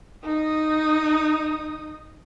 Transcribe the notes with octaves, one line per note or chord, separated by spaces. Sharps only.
D#4 D#6